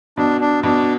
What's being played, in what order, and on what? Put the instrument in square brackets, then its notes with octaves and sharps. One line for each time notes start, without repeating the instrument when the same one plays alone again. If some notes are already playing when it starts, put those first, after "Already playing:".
[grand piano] B2 [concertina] D4
[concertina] D4
[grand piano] B2 [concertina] D4